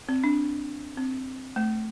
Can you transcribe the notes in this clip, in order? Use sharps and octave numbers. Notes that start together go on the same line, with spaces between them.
C4
D4
C4
A3